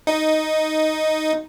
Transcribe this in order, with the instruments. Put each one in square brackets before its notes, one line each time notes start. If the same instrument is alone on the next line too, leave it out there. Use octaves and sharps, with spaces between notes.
[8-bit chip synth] D#4